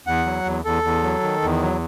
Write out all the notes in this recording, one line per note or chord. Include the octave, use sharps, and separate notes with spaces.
E2 F#5
F#3
E2
E2 A4
E2
F#3
D#3
E2
F#3